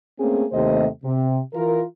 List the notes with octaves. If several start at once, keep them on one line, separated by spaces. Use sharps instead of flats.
A3 A#3 C4 C#4 G#4
D#2 C3 A3 C5 D#5
C3
E3 F4 A#4